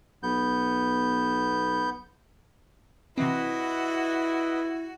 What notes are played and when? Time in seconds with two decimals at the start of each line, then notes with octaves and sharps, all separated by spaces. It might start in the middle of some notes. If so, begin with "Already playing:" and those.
0.23 B1 B3 G6
3.18 C3 E3 C4 E4 F#4 B4 D#5